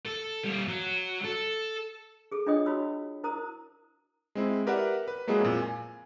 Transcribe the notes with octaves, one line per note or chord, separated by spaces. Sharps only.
A4
G3 A#3
F#3
A4
G#4 A4
D4 F4 C#5 D#5 G5 D#6
E4 F#4 C#5 B5 E6
E4 A#4 C5 A#5 D#6
G#3 C4 E4
G4 A#4 B4 D5 E5 F#5
B4
F#3 G#3 A#3 B3 E4 G#4
F2 A#2
G#5